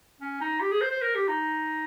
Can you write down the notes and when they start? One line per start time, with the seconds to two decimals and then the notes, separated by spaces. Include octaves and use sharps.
0.20 C#4
0.41 D#4
0.61 G4
0.71 G#4
0.81 C5
0.91 C5
1.01 A#4
1.15 G4
1.28 D#4